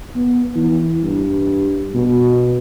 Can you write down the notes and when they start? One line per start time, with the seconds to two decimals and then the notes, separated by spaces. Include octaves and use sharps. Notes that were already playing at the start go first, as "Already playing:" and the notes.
0.16 B3
0.56 E3
1.03 G2
1.94 B2